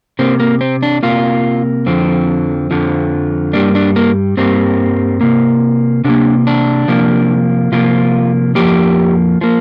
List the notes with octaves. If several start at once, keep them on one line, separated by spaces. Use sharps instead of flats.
C3 A#3 C4
A#3
C4
D4
C3 A#3 F4
F2 D3 F3 C4
F2 D3 F3
G2 G3 A#3 D4
D4
A#3
G2 G3 A#3 C4
C3 A#3
C3 A#3 D4
D4
C3 F3 A#3
C3 F3 A#3 F4
F2 F3 A#3 G4
F3 A#3